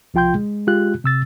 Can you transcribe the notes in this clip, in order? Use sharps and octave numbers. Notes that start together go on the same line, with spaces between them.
C2 F3 F4 G5 C6 G6
G#3
G#3 F4 G4 F#6
C3 E6 A6